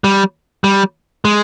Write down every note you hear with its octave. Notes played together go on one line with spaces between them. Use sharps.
G3
G3
G#3